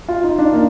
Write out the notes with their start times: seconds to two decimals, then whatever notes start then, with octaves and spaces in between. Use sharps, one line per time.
0.08 F4
0.24 D#4
0.38 D4
0.53 A#3